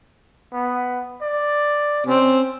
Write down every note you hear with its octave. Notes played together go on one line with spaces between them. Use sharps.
B3
D5
C4 C#4